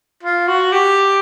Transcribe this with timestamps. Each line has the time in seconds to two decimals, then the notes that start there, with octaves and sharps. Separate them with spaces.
0.23 F4
0.48 F#4
0.72 G4